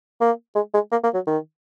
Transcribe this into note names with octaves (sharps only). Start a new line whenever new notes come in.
A#3
G#3
G#3
A#3
A#3
F#3
D#3